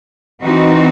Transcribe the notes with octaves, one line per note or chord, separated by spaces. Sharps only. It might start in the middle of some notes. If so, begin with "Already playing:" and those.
E3 C4 D#4 F#4